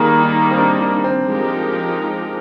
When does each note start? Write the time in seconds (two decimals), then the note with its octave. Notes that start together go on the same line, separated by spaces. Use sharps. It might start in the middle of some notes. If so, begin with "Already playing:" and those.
Already playing: D#3 G3 A#3 G#4
0.23 D#4
0.51 C4
0.58 D4
0.81 D4
1.04 C4
1.26 F3 G#3 D#4 G4 A#4